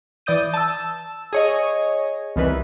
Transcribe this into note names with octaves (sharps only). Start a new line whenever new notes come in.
E3 D5 D#6 G6 D#7
A5 E6
G#4 C#5 D#5
C2 D#3 E3 B4